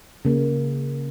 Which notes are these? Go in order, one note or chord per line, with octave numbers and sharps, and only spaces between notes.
C#3 A#3